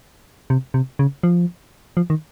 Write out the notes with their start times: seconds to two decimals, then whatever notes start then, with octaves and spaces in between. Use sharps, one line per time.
0.50 C3
0.74 C3
0.99 C#3
1.23 F3
1.97 F3
2.10 D#3